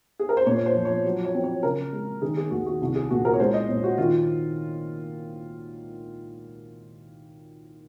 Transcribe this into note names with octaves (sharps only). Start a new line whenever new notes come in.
G#4
A#4
C5
A#2 C#5
C#5
C5
F3
C#5
F#3
C#5
C4
C#5
C#3 A#4
G#3
D#3 G#4
G#4
D#2 F#4
F#4
C2
G#4
A#2 F#4
A#4
C#5
G#3 C5
D#5
A#2 C#5
F#4
D#3 F4